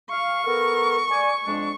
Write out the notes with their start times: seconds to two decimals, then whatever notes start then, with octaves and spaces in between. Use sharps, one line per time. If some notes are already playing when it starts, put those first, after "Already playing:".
0.11 F5 C#6
0.47 B3 A4 A#4
1.10 D5 G#5
1.46 F2 G#3 D4